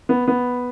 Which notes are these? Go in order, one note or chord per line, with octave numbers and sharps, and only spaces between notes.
B3
B3